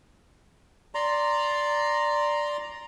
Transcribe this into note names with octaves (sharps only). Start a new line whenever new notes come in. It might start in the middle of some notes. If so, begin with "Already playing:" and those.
D5 A#5 C6